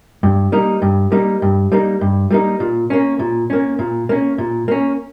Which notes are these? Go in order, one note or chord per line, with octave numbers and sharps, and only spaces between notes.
G2
G3 A#3 D#4
G2
G3 A#3 D#4
G2
G3 A#3 D#4
G2
G3 A#3 D#4
A#2
A#3 C#4
A#2
A#3 C#4
A#2
A#3 C#4
A#2
A#3 C#4